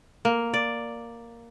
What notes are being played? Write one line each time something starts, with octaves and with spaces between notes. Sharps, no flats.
A#3
D5